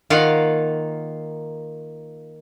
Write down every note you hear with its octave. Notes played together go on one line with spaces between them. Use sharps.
D#3 A#3 F4 F5 F#5